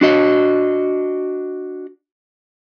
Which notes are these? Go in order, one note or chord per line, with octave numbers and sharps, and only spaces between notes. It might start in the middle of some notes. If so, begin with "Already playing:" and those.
D4 F#4 D#5